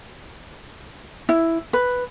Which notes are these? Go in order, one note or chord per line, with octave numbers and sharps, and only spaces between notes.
E4
B4